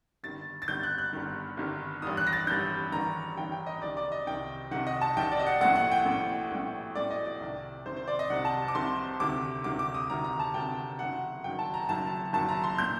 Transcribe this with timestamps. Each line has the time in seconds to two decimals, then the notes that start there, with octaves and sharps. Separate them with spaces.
0.23 G1 G2 D#3 A6
0.62 A6
0.68 G1 G2 D#3 G6
0.83 F#6
0.98 F#6
1.13 G1 G2 D#3
1.57 G1 G2 D#3
2.02 A1 G2 D#3 D#6
2.17 F#6
2.27 A#6
2.33 A6
2.47 A1 G2 D#3 G6
2.92 A1 G2 D#3 A#5
3.37 A1 G2 D#3 G5
3.52 G5
3.66 D#5
3.82 C2 C3 D#3 D5
3.97 D5
4.12 D#5
4.27 C2 C3 D#3 G5
4.71 C2 C3 D#3 F#5
4.87 D#5
5.01 A5
5.16 C2 C3 D#3 G5
5.32 D5
5.39 D#5
5.46 F#5
5.61 A#1 A2 F#5
5.76 F#5
5.92 G5
6.06 A#1 A2
6.51 A#1 A2
6.95 A#1 A2 D5
7.10 D#5
7.26 D5
7.40 C2 C3 D#3
7.85 C2 C3 D#3 C5
7.96 C5
8.08 D5
8.19 D#5
8.30 C2 C3 D#3 F#5
8.45 A5
8.68 D6
8.75 C2 C3 D#3 C6
9.20 D2 C3 D#3 D6
9.64 D2 C3 D#3 D6
9.79 D6
9.94 D#6
10.10 D2 C3 D#3 A#5
10.24 A#5
10.40 A5
10.54 D2 C3 D#3 G5
10.99 F#1 F#2 D#3 F#5
11.44 F#1 F#2 D#3 G5
11.59 A5
11.74 A#5
11.88 F#1 F#2 D#3 A5
12.33 F#1 F#2 D#3 A5
12.48 A#5
12.63 C6
12.78 A#2 G6